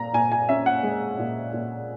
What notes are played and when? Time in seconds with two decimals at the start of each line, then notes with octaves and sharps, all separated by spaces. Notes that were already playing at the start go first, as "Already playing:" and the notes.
Already playing: A#2 A#5
0.13 A#2 G#5
0.32 G#5
0.49 C#4 E5
0.66 F#5
0.83 G#3
1.18 A#2
1.53 A#2